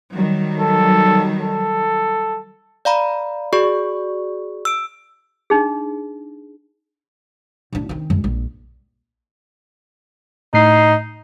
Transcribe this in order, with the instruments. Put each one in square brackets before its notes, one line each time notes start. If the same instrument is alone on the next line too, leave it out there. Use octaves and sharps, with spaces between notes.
[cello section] D#3 F#3 G3
[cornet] A4
A4
[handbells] D5 F5 A#5 B5
F#4 G#4 D5 C#6
E6 D7
[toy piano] D4 D#4 G#4
[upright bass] D1 D4
D#3 C4
F#2 G#3
A#1
[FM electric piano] A2 C7 [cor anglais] D#4